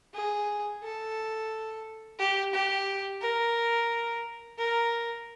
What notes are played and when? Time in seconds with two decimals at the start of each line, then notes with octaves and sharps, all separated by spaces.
0.14 G#4
0.83 A4
2.19 G4
2.53 G4
3.22 A#4
4.58 A#4